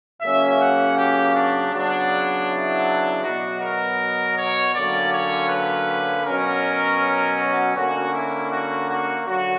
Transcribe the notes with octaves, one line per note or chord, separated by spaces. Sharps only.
C#3 F#3 A#3 C#4 E5
F#5
G4
D4
C#3 F#3 B3 D4
E4
B2 F#3 B3 F#4
A#4
C#5
D3 F#3 A#3 C#4 D5
C#5
B4
B2 F#3 C#4 A#4
F#4
D3 A#3 C#4 F#4
E4
F#4
F#4
D3 F#3 F#4